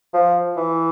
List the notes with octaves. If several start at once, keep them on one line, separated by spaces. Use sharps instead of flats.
F3
E3